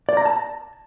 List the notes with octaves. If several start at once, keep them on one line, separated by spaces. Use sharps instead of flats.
D5
A#5
A5